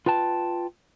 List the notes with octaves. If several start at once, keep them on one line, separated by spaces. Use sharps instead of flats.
F4 B4 G5 A5